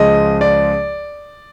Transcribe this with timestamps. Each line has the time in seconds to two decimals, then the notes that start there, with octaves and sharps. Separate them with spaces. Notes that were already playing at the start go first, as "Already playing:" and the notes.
Already playing: C#2 C#3 F3 G#3 D#5
0.41 D5